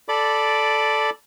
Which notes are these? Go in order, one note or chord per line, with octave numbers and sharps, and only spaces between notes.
A4 D5 B5 D6